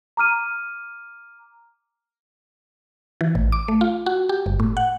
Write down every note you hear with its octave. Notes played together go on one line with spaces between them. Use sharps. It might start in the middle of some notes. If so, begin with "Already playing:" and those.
A#5 D6 F6 D#7
E3
A1
D6
A3
F4
F#4
G4
G1
A2
F#5